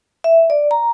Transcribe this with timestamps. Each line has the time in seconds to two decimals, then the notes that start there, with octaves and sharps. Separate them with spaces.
0.24 E5
0.50 D5
0.71 A#5